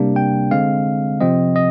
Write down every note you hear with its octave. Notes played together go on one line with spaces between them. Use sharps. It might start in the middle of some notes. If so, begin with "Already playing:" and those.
Already playing: C3 G3 A#3 D4
G5
D3 G#3 C4 F5
C3 F3 C4 D#5
D#5